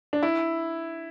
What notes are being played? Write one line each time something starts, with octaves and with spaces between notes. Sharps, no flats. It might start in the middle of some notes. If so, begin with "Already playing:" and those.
D4
E4